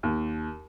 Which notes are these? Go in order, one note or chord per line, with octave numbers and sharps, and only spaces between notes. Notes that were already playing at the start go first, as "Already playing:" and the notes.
D#2